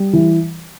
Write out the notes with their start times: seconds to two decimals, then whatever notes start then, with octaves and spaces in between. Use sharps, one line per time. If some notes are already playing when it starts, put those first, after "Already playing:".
Already playing: G3
0.13 E3